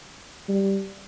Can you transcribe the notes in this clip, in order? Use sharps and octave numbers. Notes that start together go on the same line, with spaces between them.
G3